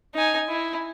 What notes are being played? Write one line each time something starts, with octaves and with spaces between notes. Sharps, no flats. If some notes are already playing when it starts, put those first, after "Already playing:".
D#4 G#5
E4